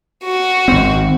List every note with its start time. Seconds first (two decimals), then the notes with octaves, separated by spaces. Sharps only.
0.25 F#4
0.68 G#1 C4